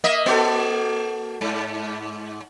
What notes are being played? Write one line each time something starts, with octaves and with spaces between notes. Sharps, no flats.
A#3 D#5 E5
A#3 F#4 A4
G#2